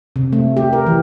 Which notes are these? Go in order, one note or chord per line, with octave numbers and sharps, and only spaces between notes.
C3
A3
G4
A#4
E3